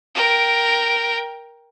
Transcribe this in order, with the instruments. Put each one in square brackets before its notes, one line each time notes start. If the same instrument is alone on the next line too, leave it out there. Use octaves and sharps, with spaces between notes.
[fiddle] A#4 G5